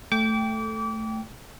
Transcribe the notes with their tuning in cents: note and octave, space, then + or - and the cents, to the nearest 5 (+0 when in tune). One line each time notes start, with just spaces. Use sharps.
A3 +0 G5 +0 D6 -30